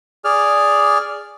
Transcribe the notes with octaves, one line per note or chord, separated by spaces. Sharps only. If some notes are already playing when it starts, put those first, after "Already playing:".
G#4 D5 F6